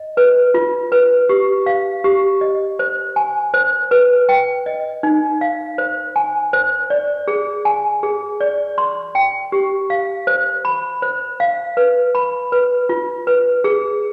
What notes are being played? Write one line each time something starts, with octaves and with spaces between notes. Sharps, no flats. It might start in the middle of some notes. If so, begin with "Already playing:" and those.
Already playing: D#5
B4
F4
B4
G4
F5
G4
D#5
C5
G#5
C5
B4
G5
D#5
D#4
F5
C5
G#5
C5
D5
G#4
G#5
G#4
D5
C6
G5
G4
F5
C5
B5
C5
F5
B4
B5
B4
F4
B4
G#4